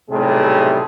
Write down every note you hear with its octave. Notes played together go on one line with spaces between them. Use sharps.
B1 A2 C3 G3 A3 G#4